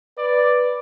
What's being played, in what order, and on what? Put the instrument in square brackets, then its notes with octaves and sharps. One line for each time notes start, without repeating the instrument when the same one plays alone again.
[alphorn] B4 [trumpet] D5